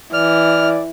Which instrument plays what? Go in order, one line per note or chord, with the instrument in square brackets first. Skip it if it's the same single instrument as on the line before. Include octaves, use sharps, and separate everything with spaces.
[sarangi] E3 [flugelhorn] D5 [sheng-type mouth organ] F6